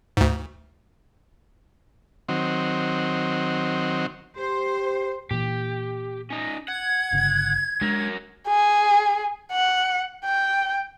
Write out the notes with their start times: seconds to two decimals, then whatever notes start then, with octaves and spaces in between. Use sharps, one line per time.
0.17 D2 G#2
2.28 D#3 F#3 C4
4.38 G4 C5
5.31 A#2 E3 G4
6.30 C#4 D#4
6.68 F#5 G#6
7.13 G1 C#3
7.81 F#3 G#3 D4 A#4
8.47 G#4
9.52 F#5
10.25 G5